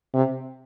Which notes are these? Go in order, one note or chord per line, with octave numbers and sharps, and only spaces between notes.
C3